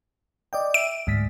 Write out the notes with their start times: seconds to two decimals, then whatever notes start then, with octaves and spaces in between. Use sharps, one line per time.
0.53 D5 D#5 G5
0.74 E5 D7
1.07 D2 G#2 B6